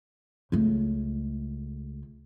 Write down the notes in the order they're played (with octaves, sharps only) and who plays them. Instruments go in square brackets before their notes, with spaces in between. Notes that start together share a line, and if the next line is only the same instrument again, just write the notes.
[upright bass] C#2 A3